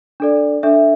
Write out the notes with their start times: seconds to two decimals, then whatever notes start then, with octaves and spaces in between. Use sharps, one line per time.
0.20 D4 A4 D5
0.63 D4 A4 E5